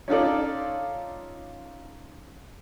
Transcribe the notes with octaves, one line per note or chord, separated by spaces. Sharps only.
C#4 D#4 F4 A4 D5